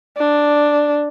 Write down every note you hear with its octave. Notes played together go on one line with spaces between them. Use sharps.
D4